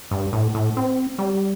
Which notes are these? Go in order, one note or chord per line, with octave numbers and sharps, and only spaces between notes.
G2
A2
A2
C4
G3